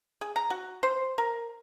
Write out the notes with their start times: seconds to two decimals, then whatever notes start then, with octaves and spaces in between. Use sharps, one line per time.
0.21 G#4
0.36 A#5
0.50 F#4
0.83 C5
1.18 A#4